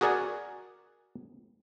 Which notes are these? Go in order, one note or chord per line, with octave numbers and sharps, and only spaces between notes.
F#4 G#4 A#4 D5 F#5 G#5